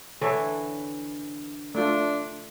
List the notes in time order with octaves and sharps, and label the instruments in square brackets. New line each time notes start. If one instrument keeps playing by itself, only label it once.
[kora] D3 E3 C#5 [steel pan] A4
[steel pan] A3 F4 [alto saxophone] D4